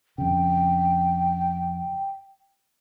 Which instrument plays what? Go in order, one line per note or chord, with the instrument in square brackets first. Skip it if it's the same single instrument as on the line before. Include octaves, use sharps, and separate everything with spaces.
[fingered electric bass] F2 C#3 [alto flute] G5